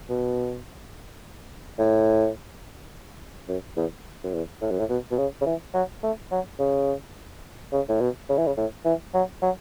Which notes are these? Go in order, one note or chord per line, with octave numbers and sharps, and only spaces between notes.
B2
A2
F#2
E2
F#2
E2
A2
F#2
A2
B2
B2
C#3
C#3
E3
F#3
A3
F#3
C#3
C#3
A2
B2
C#3
E3
C#3
A2
E3
F#3
F#3